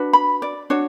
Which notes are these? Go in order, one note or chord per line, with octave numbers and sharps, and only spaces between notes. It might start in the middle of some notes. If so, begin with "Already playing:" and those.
Already playing: D4 F#4 B4
B5
D5
D4 F#4 C#5